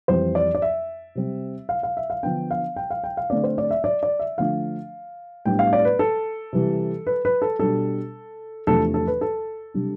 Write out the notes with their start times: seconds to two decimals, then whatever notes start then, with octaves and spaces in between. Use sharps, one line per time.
0.08 F2 E3 G3 C4 C5
0.35 D5
0.55 D5
0.62 E5
1.15 C3 G3 C4
1.69 F5
1.83 F5
1.97 E5
2.10 F5
2.23 D3 F3 B3 D4 G5
2.51 F5
2.76 G5
2.91 F5
3.04 G5
3.17 F5
3.30 D3 A3 C4 D5
3.44 C5
3.58 D5
3.71 E5
3.84 D5
4.03 D5
4.19 E5
4.38 D3 F3 A3 D4 F5
5.46 A2 G3 B3 D4 G5
5.59 F5
5.73 D5
5.85 B4
5.99 A4
6.53 C3 E3 G3
7.07 B4
7.25 B4
7.42 A4
7.59 B2 G3 D4 A4
8.67 E2 C3 F3 A3 D4 A4
8.94 A4
9.07 B4
9.21 A4
9.74 C3 G3 D4